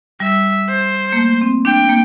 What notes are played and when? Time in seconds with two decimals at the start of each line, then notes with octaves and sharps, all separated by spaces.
0.20 G3 E5
0.69 C5
1.12 A#3
1.17 A3
1.41 C4
1.65 D4 G5
1.89 A#3